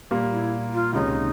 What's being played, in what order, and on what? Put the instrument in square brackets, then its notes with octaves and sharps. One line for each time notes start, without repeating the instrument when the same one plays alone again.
[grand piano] A#2 G3 A#3
[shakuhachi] E4
F4
[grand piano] C#2 C3 D#3 G#3 C#4 [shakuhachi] D#4